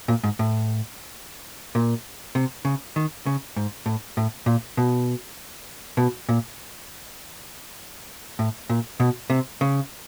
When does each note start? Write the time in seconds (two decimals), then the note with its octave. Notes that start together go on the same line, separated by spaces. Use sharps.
0.08 A#2
0.24 G#2
0.39 A2
1.75 A#2
2.35 C3
2.65 C#3
2.96 D#3
3.26 C#3
3.56 G#2
3.86 A2
4.17 A2
4.46 A#2
4.77 B2
5.97 B2
6.29 A#2
8.39 A2
8.70 A#2
9.00 B2
9.30 C3
9.61 C#3